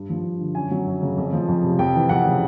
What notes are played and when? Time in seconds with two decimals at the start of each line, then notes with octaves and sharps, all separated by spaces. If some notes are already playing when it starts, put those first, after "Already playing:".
Already playing: G2
0.10 F3
0.25 G2
0.40 D3
0.55 F#2 G#5
0.71 F#3
0.87 F#2
1.02 C#3
1.17 F2
1.33 F3
1.48 F2
1.64 C3
1.79 F2 G5
1.95 E3
2.09 F2 F#5
2.25 C#3